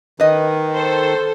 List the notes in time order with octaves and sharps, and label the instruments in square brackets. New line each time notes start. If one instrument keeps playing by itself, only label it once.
[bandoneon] D#3 [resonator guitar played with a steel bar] B4 D#5
[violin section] A4 C5